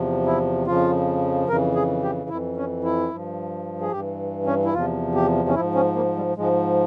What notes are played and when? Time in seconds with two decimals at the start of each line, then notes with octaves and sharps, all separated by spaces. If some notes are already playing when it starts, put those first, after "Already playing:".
Already playing: E2 C3 F3
0.26 E4
0.67 F2 C#3 F3 F4
1.48 F2 C#3 E3 A#4
1.75 G#4
2.03 G4
2.29 F2 E3 E4
2.57 C#4
2.84 E4
3.11 G2 F3
3.81 G#4
3.92 G2 G4
3.97 E3
4.46 C#4
4.65 E4
4.73 E2 C3 F3 F4
5.14 G4
5.49 C#4
5.55 G#2 F3 E4
5.75 C#4
5.96 A#3
6.16 G3
6.36 G#2 F3 G#3